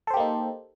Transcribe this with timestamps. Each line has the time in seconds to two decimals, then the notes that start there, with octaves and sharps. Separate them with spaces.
0.07 A4
0.11 C5
0.14 G4
0.17 A#3
0.20 D#4